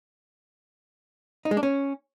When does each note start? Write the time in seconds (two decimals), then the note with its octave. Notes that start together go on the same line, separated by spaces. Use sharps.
1.45 D#4
1.51 G#3
1.57 D4
1.63 C#4